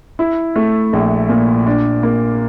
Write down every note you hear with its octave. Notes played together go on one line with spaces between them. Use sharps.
E4
A3
A#1
A#2
D4
A#3